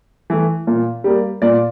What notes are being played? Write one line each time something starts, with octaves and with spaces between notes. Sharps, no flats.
E3 A3
A#2
G3 A#3
A#2 D5